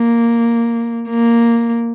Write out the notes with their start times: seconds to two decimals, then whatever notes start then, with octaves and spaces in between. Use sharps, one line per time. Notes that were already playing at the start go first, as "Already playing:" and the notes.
Already playing: A#3
1.09 A#3